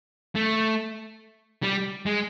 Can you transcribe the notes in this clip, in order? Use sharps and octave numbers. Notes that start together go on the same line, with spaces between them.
A3
G3
G#3